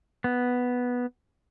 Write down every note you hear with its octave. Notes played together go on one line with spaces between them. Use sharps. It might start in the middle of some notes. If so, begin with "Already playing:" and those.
B3